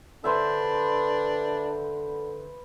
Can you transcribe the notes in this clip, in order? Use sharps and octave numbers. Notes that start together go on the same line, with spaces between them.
D3 D4 B4 C5 E5